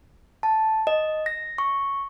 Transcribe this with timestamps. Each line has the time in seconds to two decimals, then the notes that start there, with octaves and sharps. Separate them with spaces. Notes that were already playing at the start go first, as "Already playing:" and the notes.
0.43 A5
0.87 D#5
1.26 A#6
1.58 C#6